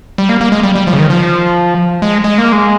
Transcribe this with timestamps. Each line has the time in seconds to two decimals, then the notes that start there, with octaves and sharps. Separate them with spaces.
0.18 G3
0.29 A#3
0.41 A#3
0.52 G#3
0.63 G3
0.76 G3
0.87 F3
0.93 C#3
0.99 D#3
1.10 F3
2.02 G#3
2.24 G#3
2.38 A#3
2.52 G#3